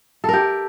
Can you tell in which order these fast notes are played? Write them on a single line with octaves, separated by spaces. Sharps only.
A4 A#4 G4